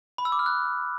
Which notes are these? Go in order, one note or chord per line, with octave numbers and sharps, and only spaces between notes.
B5
E6
D6
F6
F#6